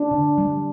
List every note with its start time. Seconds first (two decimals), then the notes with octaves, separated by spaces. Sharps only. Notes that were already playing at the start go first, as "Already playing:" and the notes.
Already playing: D4
0.11 D3
0.38 G3